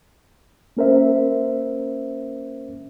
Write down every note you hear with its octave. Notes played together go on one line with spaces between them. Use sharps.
A#3 C#4 A#4 C5 E5